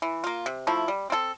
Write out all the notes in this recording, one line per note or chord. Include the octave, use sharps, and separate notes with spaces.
E3
A#3 F4
C3
F3 A3 E4
G3
C4 E4 A4